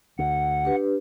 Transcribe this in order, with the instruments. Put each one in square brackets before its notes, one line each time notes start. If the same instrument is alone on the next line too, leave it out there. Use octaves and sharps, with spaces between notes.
[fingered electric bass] D2 [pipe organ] F#5
[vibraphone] D4 G4 B4